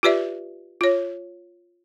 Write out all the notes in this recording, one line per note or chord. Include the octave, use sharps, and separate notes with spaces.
F4 G4 B4 D5 E5
F4 C#5